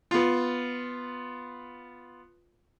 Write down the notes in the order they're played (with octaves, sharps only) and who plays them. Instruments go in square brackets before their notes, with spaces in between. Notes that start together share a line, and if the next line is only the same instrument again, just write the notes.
[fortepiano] B3 F4